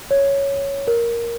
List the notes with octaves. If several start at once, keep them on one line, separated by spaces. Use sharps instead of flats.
C#5
A#4